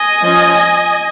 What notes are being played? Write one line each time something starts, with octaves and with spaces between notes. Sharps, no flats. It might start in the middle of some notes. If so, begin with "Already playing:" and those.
Already playing: D#5 G#5
F3 C#4